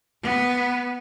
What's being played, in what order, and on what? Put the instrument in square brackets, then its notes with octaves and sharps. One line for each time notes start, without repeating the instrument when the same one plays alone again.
[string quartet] B3